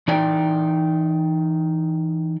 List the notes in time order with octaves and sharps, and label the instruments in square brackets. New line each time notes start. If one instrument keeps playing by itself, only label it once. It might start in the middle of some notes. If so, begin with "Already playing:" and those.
[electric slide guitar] E3 D#4 D5 G5